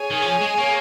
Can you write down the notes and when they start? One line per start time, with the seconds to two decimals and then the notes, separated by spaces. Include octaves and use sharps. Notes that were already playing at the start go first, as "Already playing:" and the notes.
Already playing: G#4 C#5 G#5
0.11 D#3
0.22 F3
0.41 G#3
0.58 A#3